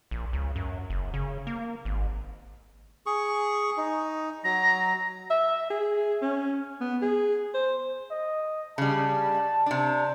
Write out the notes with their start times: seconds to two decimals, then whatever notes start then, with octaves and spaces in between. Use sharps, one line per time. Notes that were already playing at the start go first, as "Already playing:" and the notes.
0.11 A#1
0.33 C#2
0.56 F#2
0.90 F#1
1.14 C#3
1.47 A#3
1.85 G#1
3.06 G#4 C#6
3.77 D#4
4.44 F#3 A#5 A#6
5.30 E5
5.70 G#4
6.22 C#4
6.81 B3
7.02 G#4
7.54 C5
8.11 D#5
8.78 C#3 G3 A5
9.66 C3 D4